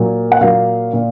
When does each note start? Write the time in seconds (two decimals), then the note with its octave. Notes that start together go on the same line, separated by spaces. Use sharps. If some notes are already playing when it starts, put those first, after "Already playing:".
Already playing: A#2 F#3 A#3
0.32 F#5
0.41 A#2 F#3 A#3 F5
0.93 A#2